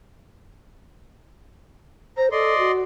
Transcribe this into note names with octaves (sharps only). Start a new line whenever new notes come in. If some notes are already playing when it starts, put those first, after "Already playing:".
C5 A#5
A4 D5 D#5 C6
F#4